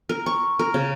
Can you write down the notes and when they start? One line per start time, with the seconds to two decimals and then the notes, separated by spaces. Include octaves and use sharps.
0.09 A#4
0.26 C#6
0.59 A#4
0.74 C#3